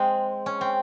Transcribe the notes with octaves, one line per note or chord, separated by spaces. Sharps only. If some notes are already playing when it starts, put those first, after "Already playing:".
Already playing: G#3 C4
C#4
C4